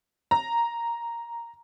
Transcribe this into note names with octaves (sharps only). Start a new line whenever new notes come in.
A#5